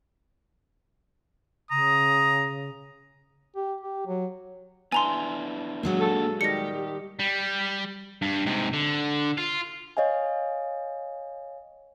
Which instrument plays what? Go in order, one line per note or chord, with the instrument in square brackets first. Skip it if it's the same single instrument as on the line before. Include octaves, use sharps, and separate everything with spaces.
[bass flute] C#3 [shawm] A#5 [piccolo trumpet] D#6
[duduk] G4
G4
F#3
[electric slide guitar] B3 D4 E4 [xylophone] G#5 A#5 C6
[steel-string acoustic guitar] A#2 F#3 G#3 [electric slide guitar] A#3 D4 F#5
[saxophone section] A4
[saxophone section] D#3 G3 [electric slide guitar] G4 [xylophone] A#6 C#7
[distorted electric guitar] G3
G2
G#2 C3
D3
F4
[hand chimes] C#5 D#5 F5 G#5